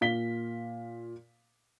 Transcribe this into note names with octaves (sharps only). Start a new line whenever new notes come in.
A#2 F5 B6 G7